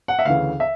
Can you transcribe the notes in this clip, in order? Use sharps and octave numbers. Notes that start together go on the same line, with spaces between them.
F#5
E5
D2 C#3 E3 F5
E5